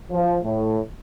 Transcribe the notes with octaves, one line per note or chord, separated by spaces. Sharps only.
F3
A2